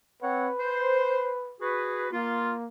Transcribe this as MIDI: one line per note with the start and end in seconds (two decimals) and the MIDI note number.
0.22 0.48 60
0.22 1.56 71
0.22 0.48 73
0.22 0.48 78
0.60 1.29 72
1.61 2.08 66
1.61 2.08 68
1.61 2.08 71
2.13 2.68 58
2.13 2.53 65